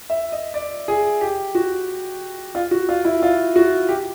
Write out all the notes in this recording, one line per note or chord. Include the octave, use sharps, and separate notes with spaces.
E5
D#5
D5
G#4
G4
F#4
F4
F#4
F4
E4
F4
F#4
G4